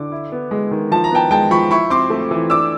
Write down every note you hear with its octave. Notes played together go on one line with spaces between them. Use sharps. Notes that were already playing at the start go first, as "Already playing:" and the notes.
Already playing: D3 D6
E4
B3
G#3
D#3
F3 A5
A#5
B3 G5 A5
G#3 G5 A5
F3 B5 C#6
E4 B5 C#6
C4 C6 D6
A3
E3
D4 D6 E6